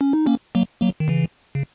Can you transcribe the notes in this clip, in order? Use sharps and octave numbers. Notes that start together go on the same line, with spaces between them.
C#4
D#4
A#3 C#4
F#3 A#3
F#3 A#3
D#3
C#3 E3
C#3